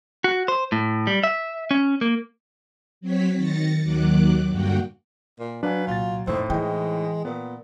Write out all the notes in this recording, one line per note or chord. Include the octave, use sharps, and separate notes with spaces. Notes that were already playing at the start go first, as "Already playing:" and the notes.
F#4
C5
A2
G3
E5
C#4
A#3
F#3 C4 C#5 B6
D#3 A6 A#6 C#7
D#2 D#3 F#3 D6 F#6
G2 D3 A#3 F#4 F#5 G5
A#2
F#3 D4 B4 F5 G#5
C2 A#2 F4 A6
F2 A2 C4 D#4 C5
E3 G#3 G5
A#2 B3